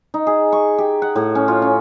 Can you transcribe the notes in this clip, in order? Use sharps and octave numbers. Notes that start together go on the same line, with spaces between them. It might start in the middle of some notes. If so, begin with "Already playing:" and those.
D#4
G#4
C#6
G4
F#5
A2
C#4
F4
C#4